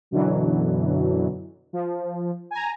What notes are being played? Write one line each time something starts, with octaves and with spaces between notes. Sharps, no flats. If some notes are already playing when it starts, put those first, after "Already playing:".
F#2 B2 D3 E3 F#3
F3
G#5 A#5